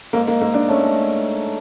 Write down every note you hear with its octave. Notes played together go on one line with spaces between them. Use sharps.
G#2 A#3
A#3
G#2 A#3
D4
A3 C#4